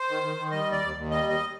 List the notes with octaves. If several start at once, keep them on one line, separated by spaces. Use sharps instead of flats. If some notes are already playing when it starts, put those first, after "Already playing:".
Already playing: C5
D#3
D#3
D#3
G3 D#5
D#2
D5
D#2
D#2
G3 D#5
D#2 D#5